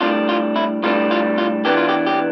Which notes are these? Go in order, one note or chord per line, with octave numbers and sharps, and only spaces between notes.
A2 G3 D4 F4
F4
E4
A2 G3 D4 F4
F4
F4
E3 B3 D4 G4
F4
G4
G4